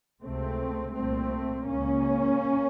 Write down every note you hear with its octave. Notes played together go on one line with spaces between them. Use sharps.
C#2 C3 A3 C4
C2 A#2 A3 C4
C#2 C#3 A#3 C#4